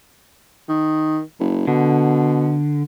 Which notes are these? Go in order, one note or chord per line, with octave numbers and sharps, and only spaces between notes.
D#3
F#1
B2 D3